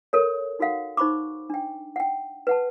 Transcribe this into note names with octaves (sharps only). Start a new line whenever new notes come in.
A4 A#4 C#5
D#4 F#4 A4 F5 F#5
D#4 C5 B5 C#6 D6
D4 G5
F#5 G5
B4 F#5 A5